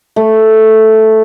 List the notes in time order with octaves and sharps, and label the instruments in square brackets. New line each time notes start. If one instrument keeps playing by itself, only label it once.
[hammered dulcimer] A3